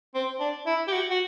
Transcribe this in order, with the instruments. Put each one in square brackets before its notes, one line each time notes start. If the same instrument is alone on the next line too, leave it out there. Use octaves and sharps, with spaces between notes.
[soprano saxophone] C4
D4
E4
G4
F#4
F#4